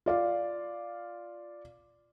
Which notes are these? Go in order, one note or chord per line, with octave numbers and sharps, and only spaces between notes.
F4 D5 F5